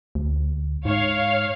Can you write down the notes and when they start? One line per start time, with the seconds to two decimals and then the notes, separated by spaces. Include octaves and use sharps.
0.15 D2
0.85 G#2 C#5 F5 F6